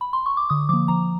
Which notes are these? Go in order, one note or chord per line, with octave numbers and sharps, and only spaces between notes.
B5
C6
C#6
D6
D3 D#6
F3 A#3 D6
F3 A#5